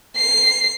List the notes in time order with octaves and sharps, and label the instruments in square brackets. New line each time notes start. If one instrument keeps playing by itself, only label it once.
[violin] C7